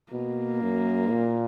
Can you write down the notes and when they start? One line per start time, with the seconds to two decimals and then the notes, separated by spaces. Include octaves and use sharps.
0.12 B2 A#3
0.62 F#2
1.11 A#2